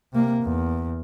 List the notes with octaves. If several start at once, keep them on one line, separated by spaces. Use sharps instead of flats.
C3 A#3
E2